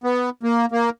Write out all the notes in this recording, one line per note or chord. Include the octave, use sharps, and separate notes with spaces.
B3
A#3
A#3